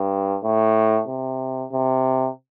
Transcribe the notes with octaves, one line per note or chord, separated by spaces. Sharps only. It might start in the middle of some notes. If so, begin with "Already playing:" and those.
Already playing: G2
A2
C3
C3